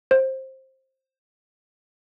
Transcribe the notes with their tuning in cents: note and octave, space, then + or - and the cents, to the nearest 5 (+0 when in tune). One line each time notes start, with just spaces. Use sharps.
C5 +15